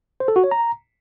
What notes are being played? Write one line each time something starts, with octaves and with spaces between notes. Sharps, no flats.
C5
A4
F#4
C#5
A#5